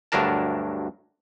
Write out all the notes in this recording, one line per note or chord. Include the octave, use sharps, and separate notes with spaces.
D2 G2 F#3 D4 A#4 A5